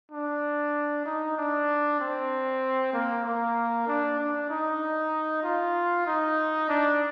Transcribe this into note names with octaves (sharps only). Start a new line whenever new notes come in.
D4
D#4
D4
C4
A#3
A#3
D4
D4
D#4
F4
D#4
D4